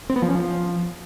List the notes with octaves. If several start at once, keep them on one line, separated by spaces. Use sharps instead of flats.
C4
B3
F3
C#4
F3